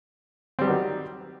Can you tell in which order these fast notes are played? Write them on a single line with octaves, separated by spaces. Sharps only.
C4 G3 G4 F#3 D#3